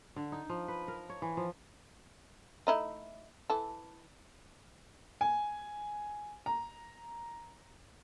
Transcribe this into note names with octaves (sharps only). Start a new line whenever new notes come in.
D3
D#4
F3
B4
A#4
C#5
E3
F3
A3 D#4 E4
E3 A4
G#5
A#5